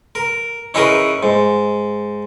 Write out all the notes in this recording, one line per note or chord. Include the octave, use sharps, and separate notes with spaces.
A#4
C#4 D#4 E4 G#4 A#4 B4
G#2